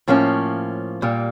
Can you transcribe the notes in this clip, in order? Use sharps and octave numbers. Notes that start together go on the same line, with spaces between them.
A2 F3 A#3 C#4
A#2 G3 A#3